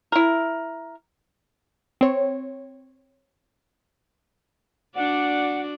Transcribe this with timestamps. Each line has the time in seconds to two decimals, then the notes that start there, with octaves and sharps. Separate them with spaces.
0.12 E4 A#4
2.01 C4 C#5
4.96 D4 F#4 D5 F#5